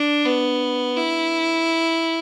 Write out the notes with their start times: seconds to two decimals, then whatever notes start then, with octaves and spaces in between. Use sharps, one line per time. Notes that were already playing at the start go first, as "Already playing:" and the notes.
Already playing: D4
0.25 B3
0.96 E4